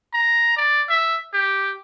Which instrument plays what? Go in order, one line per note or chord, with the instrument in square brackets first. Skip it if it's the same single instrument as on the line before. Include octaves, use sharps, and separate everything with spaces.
[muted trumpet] A#5
D5
E5
G4